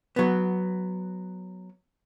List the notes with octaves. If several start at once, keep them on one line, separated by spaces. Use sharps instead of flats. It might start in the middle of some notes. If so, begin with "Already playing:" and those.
F#3 B3